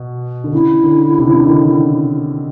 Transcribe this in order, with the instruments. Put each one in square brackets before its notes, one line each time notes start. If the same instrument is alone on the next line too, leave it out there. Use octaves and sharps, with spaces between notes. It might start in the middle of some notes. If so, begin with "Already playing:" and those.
Already playing: [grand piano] B2
D3
[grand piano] C#3 [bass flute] E4
[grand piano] D3
C3
C#3
D3
D#3